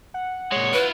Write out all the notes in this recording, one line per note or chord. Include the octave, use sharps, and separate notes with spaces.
F#5
A#2 G#3 C#5
E4 F4 B4